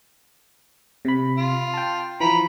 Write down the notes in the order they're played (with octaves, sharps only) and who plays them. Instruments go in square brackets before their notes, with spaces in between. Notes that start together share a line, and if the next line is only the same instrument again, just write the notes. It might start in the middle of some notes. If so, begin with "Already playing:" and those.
[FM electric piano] C3 B5
[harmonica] F4
[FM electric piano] G5 A5
[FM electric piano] E3 F3 [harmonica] A#5 B5